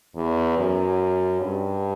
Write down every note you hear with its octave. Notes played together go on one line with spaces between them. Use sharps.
E2
F#2
G2